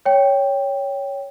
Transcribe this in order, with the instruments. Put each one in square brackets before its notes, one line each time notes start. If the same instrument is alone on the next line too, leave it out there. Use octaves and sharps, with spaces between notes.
[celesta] C#5 G5